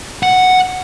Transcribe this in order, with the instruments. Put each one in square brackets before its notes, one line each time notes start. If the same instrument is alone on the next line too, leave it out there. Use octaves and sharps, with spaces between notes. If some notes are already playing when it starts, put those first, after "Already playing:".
[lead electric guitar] F#5